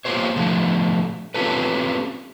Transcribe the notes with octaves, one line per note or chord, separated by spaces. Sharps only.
A#3 F4 G4 C5 C#5
A2 D3 F3 A3
C4 C#4 F4 G4 A4 B4